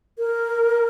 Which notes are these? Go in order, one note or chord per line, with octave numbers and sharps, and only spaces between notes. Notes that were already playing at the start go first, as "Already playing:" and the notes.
A#4